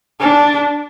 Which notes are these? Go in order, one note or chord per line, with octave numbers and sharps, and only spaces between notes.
D4